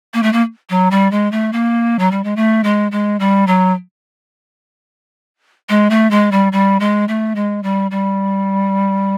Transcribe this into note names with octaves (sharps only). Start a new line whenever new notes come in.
A#3
A3
A#3
F#3
G3
G#3
A3
A#3
F#3
G3
G#3
A3
G#3
G#3
G3
F#3
G#3
A3
G#3
G3
G3
G#3
A3
G#3
G3
G3